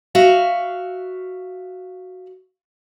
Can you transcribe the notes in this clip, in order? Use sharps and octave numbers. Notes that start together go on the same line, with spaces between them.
F#4 E5 F5